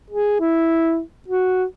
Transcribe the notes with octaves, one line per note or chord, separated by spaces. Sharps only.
G#4
E4
F#4